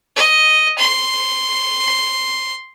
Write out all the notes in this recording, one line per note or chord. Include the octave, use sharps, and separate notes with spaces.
D#5
C6